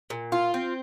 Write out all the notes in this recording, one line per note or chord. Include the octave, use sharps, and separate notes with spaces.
A#2
F4
C4